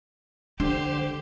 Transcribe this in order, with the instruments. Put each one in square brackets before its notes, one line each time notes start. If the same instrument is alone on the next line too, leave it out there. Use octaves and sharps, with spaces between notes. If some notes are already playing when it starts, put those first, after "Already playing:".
[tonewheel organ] D3 C5 C6 [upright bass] D4 [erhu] G4